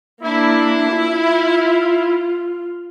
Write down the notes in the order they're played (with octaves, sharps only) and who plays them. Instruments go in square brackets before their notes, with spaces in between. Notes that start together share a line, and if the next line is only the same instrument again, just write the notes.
[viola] A#3 D4 [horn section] E4
[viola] F4